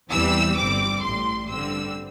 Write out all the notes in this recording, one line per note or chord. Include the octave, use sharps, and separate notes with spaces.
E2 E3 G3 C4 E6
G1 G2 G3 C4 D6
A1 A2 G3 C6
G2 D3 G3 C4 E6